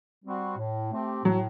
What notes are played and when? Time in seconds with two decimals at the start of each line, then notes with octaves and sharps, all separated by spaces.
0.23 G3 C4 F#4
0.57 A2
0.91 A3 C4 G4
1.24 A2 F#3